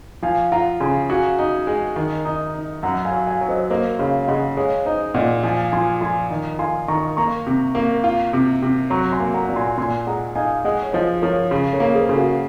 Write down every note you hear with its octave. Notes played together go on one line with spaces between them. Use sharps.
F3 F5 G#5
F4 F#5 A#5
C#3 G#5 C6
F#4 F5 G#5
D#4
G#3
D#3
D#4
D#4
F#2 F#5 A#5
F5 G#5
F#3
F5 G#5
F#3
C5 D#5
A#3 C5 D#5
C#3 C#5 F5
C#3 D#5 F#5
G#3 C#5 F5
D#4 C5 D#5
A#2 D#5 F#5
F3 F5 G#5
F3 G#5 C6
F3 G#5 C6
D#3
F4 G#5 C6
D#3 A#5 C#6
A#3 A#5 C#6
C3
A#3
F4
C3
C3
F#3 A#5 C#6
G#5 C6
A#3
F#5 A#5
A#2
G#5 C6
A#2 G#5 C6
G#3 F#5 A#5
D#4 F5 G#5
G#3 D#5 F#5
C#5
F3 C5 D#5
F3 A#4 C#5
C#3
A#4 C#5
A#3
G#4 C5
C#3 G#4
F#4 A#4